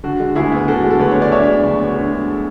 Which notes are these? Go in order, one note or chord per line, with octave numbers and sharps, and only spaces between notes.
D3 F#4
G#3
D2 E4 G#4
B3
D3 F#4 A4
G#3
A4
D2 B4
B3 C#5
D5
D3 C#5 E5
G#3
D2
B3
D3
G#3